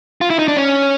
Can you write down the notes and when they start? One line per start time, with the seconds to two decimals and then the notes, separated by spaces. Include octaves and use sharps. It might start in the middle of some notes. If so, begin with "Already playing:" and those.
0.21 F4
0.30 E4
0.39 D#4
0.48 D4
0.57 C#4